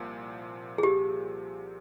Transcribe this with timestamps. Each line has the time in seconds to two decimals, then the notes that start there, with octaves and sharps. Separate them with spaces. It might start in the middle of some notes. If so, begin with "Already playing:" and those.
Already playing: C2 A#2 F3
0.78 G#4
0.83 G4